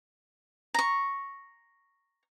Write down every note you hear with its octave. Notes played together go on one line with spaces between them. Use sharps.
A#5 C#6